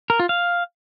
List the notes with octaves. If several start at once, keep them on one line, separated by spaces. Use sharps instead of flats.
A#4
F4
F5